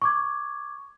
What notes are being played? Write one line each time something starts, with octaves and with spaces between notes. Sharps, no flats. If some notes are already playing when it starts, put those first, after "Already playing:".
C#6 D6 G#6